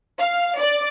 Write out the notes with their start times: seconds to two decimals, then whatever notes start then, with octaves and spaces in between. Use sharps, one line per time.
0.18 F5
0.59 D5